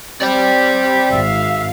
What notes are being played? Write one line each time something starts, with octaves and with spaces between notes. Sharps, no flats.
C4 G4 D5 G5
G#1 E5 F5